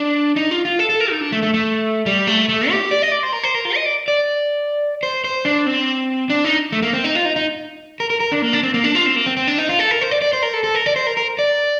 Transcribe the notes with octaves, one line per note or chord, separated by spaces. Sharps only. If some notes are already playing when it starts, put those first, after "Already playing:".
Already playing: D4
D#4
F4
F4
A4
A4
A#4
D#4
D4
A3
A3
A3
G3
A3
A3
G4
D5
D#5
D5
C5
A#4
C5
A#4
F4
D#5
D5
D5
C5
C5
D4
C4
D4
D#4
A3
A#3
C4
D#4
F4
D#4
D#4
A#4
A#4
A#4
D4
A#3
D4
C4
A#3
D4
F4
C4
A#3
C4
C4
D4
D#4
F4
A4
A#4
C5
D5
D5
C5
A#4
A4
A4
A#4
D5
C5
A#4
A#4
D5